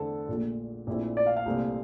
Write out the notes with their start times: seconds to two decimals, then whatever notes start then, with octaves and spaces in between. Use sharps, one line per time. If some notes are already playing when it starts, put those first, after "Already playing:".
Already playing: E2 D3 A3 C4 A4
0.29 A#1 A#2 A3
0.87 A#1 A#2 A3 C4 E4
1.17 D5
1.26 F5
1.37 F5
1.46 C2 A#2 A3 C4